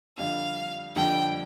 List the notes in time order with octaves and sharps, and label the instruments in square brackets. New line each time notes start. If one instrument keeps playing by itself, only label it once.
[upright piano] F2 D3 G3 D4 [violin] F5
[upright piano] F2 D3 G3 D4 [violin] G5